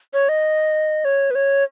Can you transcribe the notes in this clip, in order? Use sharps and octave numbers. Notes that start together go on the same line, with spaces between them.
C#5
D#5
C#5
B4
C#5